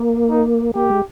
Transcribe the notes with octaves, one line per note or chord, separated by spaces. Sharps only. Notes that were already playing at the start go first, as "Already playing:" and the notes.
Already playing: A#3
D#4
A#3 G4
G#3